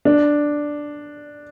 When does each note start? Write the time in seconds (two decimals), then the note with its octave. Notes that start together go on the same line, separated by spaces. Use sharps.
0.05 D4